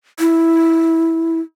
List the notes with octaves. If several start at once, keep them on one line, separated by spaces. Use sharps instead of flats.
E4